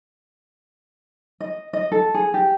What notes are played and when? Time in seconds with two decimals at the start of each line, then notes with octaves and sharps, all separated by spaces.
1.40 D#5
1.73 D#5
1.92 A4
2.14 G#4
2.34 G4